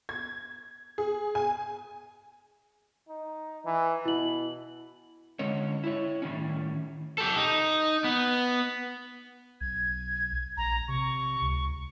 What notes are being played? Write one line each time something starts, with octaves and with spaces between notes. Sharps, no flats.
G#6
G#4
G#5
D#4
E3
B2 E4 F#7
D3 G#3 C#4 C#5
E4 C#5
A2 D#3 G3 C#4
G4 A4
D#4
B3
B1 G#6
A#1 A#5
C3 C#6
C#2